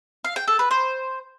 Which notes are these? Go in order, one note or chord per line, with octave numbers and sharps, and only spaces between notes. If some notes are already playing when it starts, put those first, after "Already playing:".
F5
G5
A4
B4
C5